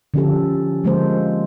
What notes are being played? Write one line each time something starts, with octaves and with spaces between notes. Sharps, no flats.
D3 F3 C#4 F4 G4 A4
D3 F3 G#3 A#3 A4 C5